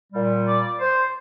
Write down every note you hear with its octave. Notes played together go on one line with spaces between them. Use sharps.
A#2 G3
D5
C5